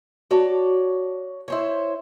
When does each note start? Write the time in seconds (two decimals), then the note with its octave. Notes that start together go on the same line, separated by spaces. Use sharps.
0.31 F#4 C#5 D5 A5
1.48 E4 C5 C#5